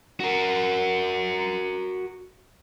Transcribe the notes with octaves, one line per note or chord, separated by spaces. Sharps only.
F#4 A#4